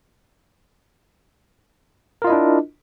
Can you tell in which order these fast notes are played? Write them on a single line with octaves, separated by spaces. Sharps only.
A#4 F4 D#5 E4 D4